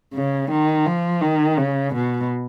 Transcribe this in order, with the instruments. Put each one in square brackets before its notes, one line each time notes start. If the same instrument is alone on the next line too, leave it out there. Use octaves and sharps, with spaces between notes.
[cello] C#3
D#3
F3
D#3
C#3
B2